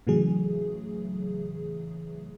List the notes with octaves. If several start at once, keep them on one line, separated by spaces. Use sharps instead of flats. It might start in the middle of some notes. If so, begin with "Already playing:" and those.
A2 C#3 E3 F#3 A3 G#4